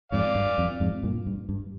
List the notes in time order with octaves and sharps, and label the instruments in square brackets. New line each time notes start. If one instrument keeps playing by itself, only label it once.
[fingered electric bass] F2 G#2 [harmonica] D5 F5
[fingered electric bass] G2
F2
F2 G#2
G2 A#2
G2
G2